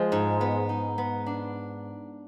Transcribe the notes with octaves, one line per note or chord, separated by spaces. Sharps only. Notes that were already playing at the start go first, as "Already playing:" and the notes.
Already playing: F3 G#3
G#2
B3
D#4
B3
D4